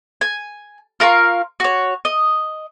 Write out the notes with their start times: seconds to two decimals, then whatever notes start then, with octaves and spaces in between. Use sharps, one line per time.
0.21 G#5
1.00 F4 A#4 F5 C#6
1.60 F#4 C#5
2.05 D#5